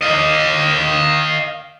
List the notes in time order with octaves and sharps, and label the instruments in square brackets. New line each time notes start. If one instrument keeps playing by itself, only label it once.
[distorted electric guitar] D#5 F5